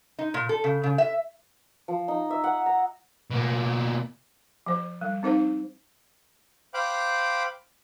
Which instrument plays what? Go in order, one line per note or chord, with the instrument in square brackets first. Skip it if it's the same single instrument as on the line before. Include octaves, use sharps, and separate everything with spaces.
[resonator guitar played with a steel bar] D#4
A#2
A4
C#3
C#3
E5
[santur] F3
D#4
E5
F#5
A#5
[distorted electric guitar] B2 A#3
[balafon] F3 C5
G3
C4 D#4 C5 F5
[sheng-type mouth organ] C5 F5 G5 B5 D6 F#6